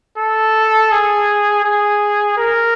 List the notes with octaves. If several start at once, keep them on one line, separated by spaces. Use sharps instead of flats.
A4
G#4
G#4
A#4